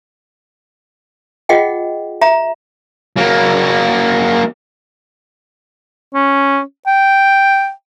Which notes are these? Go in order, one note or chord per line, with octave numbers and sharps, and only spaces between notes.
F4 G#4 D#5 F#5 G5
E5 A#5
F#3 A#3
C#4
G5